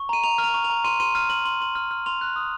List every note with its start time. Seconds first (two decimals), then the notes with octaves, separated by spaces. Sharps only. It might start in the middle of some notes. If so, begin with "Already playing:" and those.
Already playing: C#6
0.09 A#5 D#7
0.23 A#5 F7
0.38 F6
0.44 F7
0.54 C#6
0.64 F7
0.70 A#5
0.84 C6 D#7
1.00 C6 D#7
1.15 F6 D#7
1.30 F6 F#7
1.45 C6 F#7
1.60 C6 F#7
1.75 F6
1.91 F6
2.06 C6 F7
2.21 F#6
2.36 D#6